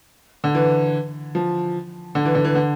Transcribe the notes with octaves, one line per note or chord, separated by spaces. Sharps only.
D3
E3
F3
D3
E3
D3
E3
D3